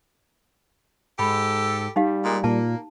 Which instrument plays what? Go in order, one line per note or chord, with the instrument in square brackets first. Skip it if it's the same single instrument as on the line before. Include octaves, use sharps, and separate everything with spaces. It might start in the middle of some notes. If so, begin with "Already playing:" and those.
[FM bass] G#2 [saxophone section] G4 A4 [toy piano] B5
[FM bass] G3 [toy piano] D#4 G4 F5
[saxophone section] A#2 G#3 A#3
[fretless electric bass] A#2 [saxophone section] A#3 [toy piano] A5